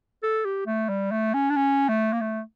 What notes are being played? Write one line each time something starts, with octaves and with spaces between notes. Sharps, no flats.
A4
G4
A3
G3
A3
C#4
D4
C#4
A3
A#3
A3